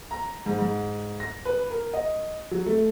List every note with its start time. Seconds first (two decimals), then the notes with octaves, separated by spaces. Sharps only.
0.11 A#5
0.46 G#2
0.59 G#2
1.20 A#6
1.45 B4
1.70 A#4
1.94 D#5
2.51 F#3
2.66 A3